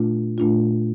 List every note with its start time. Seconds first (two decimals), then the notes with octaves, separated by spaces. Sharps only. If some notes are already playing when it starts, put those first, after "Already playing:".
Already playing: A#2 A3 D4 F4
0.38 A#2 A3 D4 F4